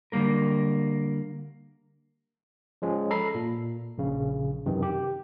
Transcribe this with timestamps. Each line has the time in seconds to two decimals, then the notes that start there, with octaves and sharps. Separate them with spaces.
0.12 D3 G3 A#3 A#4
2.82 F3 G#3 C#4
3.11 A4 A#5 B5 C7
3.35 A#2
3.98 A#1 C#3
4.66 F#2 C3 D#3 E3
4.83 G4